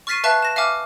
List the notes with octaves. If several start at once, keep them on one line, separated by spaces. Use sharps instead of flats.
C#6 F6 A6 B6 C7 D#7
B4 E5 F5 A5 C#6 F#6
A#6 E7
E5 F5 G#5 D6 F6